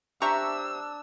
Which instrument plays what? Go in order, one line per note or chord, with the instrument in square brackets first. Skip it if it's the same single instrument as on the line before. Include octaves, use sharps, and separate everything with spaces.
[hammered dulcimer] D4 [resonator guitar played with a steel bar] G4 C5 E5 [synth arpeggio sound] A#5 C#6 [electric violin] E6